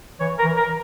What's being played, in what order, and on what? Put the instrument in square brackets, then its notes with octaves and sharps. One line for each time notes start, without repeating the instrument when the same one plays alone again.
[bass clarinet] E3 [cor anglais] C#5
[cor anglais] A#4
[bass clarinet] E3
[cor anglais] A#4